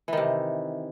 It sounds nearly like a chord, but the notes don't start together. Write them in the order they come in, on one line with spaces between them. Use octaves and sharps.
E3 D#3 C3